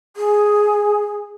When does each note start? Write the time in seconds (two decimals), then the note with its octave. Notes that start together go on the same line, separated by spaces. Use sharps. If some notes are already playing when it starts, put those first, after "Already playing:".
0.16 G#4